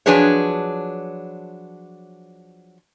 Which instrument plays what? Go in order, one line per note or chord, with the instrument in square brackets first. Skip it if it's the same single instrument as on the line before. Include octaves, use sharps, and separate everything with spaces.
[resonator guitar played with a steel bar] F3 F#3 D4 G#4 B4 C#5